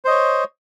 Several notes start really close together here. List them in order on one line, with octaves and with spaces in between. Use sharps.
C5 D#5 C#5